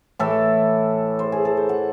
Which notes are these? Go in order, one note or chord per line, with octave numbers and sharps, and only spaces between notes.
A2 E3 A4
C5
G#4
A4
C5
F#5